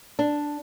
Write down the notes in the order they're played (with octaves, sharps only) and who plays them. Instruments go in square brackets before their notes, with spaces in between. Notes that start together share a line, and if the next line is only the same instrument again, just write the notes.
[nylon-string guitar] D4